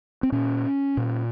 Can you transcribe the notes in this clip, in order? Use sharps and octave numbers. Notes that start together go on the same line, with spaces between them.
C4
A#2 C#4
A#2